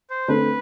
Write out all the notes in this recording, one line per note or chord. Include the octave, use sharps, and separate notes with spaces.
C5
D3 A3 C4 B4